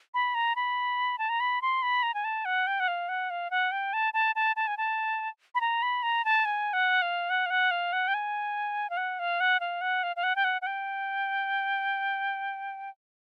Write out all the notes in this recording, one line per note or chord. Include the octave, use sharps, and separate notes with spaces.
B5
A#5
B5
A5
A#5
B5
C6
B5
A#5
G#5
A5
F#5
G5
F#5
F5
F#5
F5
F#5
G5
A5
A5
A5
A5
G#5
A5
B5
A#5
B5
A#5
A5
G#5
F#5
F5
F#5
F5
F#5
F5
F#5
G5
G#5
F5
F#5
F5
F#5
F5
F#5
F5
F5
F#5
G5
F#5
F#5
G5